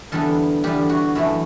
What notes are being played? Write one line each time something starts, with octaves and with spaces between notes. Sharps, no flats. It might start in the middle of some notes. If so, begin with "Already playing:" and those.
E2 D3 G3 B3 A4
E2 D3 G3 B3 G4
F#4
F#2 E3 A3 E4